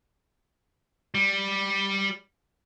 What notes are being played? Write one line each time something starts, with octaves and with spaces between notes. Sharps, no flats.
G3